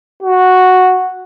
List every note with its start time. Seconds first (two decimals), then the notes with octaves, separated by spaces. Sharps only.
0.23 F#4